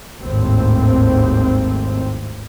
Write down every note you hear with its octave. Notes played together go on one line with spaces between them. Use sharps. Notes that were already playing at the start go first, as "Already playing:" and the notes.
G#1 D#2 A2 C4